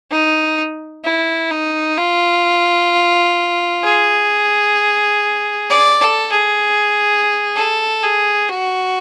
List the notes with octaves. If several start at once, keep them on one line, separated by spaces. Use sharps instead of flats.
D#4
E4
D#4
F4
G#4
D5
A4
G#4
A4
G#4
F#4